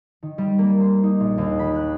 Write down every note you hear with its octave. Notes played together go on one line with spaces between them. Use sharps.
D#3
G3
A#3
C5
D#4
A#1
D#2
B5
F#6